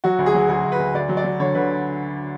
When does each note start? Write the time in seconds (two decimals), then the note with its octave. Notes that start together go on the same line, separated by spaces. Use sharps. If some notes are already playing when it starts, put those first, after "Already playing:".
0.04 F#3 F#4
0.19 D2
0.26 G#4
0.35 F#3
0.49 D2 G#4
0.64 D2
0.72 B4
0.79 D2
0.94 D2 D5
1.09 F#3
1.17 D5
1.24 F#3
1.40 D3 C#5
1.55 D3 B4